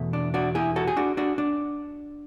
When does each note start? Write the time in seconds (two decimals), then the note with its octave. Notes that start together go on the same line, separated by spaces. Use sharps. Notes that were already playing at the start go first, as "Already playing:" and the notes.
Already playing: E2 B2 A3
0.13 D4
0.34 D4 F#4
0.55 E4 G#4
0.76 F#4 A4
0.87 G#4
0.97 D4 F#4
1.17 D4 F#4
1.38 D4